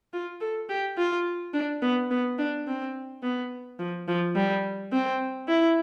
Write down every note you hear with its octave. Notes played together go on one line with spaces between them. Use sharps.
F4
A4
G4
F4
D4
B3
B3
D4
C4
B3
F3
F3
G3
C4
E4